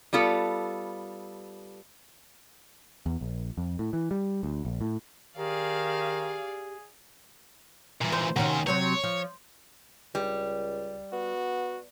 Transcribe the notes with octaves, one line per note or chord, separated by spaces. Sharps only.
G3 B3 F4 A4
E2
A#1
F2
A2
E3
G3
D2
A#1
A2
D#3 G4 G#4 D5 F5
E2 A#2
C5
D#2 C3 D#3 C#4 F#4
C3 F#3 C4 C#5
F3
C#2 G3
B3 F#4